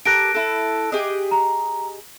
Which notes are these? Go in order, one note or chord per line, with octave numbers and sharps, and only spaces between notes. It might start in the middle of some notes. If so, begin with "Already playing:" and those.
G4 A4 A#4 F#6 A#6 D7
E4 A4
G4 G#4 D#5
A#5